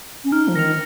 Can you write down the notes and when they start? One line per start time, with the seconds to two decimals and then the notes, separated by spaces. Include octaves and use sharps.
0.24 C#4
0.32 D#4 F6
0.48 F3
0.55 D#3 A#6 C#7 F7